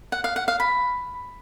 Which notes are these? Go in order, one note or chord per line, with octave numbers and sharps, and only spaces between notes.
F#5
F5
F#5
F5
B5